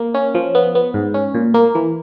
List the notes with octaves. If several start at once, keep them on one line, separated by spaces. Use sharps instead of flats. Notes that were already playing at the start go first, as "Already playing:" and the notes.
Already playing: A#3
C#4
F3
B3
B3
G#2
C#4
A#2
A#3
E3